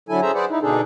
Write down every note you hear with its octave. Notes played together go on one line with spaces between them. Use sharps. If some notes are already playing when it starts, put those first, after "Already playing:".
D3 F#3 E4 A4 G#5
C#4 G#4 A4 C5 E5 A#5
G#4 B4 C5 D5 F#5
D#4 E4
B2 D3 D4 D#4 G#4 A4